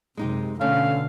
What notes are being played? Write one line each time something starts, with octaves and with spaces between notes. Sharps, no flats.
F#2 C3 G#3 D#4 G4
B2 D3 A3 C#4 F5